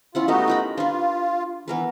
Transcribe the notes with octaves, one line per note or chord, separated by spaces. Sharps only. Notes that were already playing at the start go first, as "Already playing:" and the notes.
C#4 E4 F4 F#5
A3 B3 D#4 F#4 G4 D#5
F4 A#4 B5
D4 F4 B4
E3 B3 A#4 B4